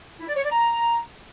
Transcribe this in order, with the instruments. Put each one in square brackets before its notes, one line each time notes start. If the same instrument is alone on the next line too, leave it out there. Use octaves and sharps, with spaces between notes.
[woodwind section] E4
D5
C#5
D5
A#5